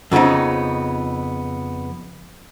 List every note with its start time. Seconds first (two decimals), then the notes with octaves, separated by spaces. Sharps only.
0.12 F2 C#3 B3 C4 D#4